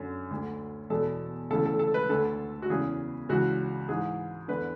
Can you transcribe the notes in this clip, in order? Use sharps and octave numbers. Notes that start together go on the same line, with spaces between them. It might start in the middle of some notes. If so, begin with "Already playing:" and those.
Already playing: F#2 D3
D2 D3
E2 B2 A4
D2 C#3 E3 A4
A4
A4
B4
D2 D3 A4
F#4
E2 C#3 E3 G#4
C#2 C#3 E3 F#4
G#2 E3 G#4
E2 D3 B4